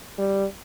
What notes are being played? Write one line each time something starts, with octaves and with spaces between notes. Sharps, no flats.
G3